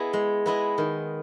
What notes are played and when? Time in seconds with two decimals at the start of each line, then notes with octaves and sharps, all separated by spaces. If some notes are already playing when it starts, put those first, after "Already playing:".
Already playing: B3 E4 G#4 D#5
0.13 G#3
0.46 B3 E4 G#4 D#5
0.78 D#3